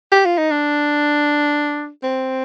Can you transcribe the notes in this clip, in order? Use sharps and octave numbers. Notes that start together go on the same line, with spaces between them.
G4
F4
D#4
D4
C4